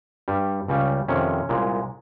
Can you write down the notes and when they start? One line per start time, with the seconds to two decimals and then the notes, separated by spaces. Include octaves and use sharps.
0.28 G2 G3
0.68 C#2 C#3 G3
1.08 F2 C3 D#3 C#4
1.49 C2 A#2 G#3